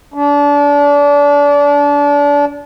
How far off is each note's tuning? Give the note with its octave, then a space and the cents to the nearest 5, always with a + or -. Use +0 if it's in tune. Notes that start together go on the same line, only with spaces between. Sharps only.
D4 -30